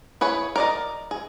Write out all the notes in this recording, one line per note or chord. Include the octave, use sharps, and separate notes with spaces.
E4 G#4 B4 C#5
A#4 D5 D#5
G#4